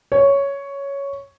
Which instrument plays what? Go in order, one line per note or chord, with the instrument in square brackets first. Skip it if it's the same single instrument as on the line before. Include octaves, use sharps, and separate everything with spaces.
[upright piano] C#5